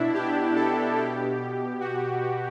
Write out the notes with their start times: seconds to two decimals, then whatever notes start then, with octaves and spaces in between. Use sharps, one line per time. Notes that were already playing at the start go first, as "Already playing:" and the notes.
Already playing: B2 D4 E4
0.14 G4
0.56 A4
0.97 B2 G4
1.81 F#4